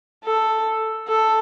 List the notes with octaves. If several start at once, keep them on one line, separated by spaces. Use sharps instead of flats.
A4
A4